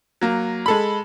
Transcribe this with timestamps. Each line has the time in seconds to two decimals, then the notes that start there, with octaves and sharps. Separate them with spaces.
0.21 F#3 A#3
0.66 G#3 A4 B5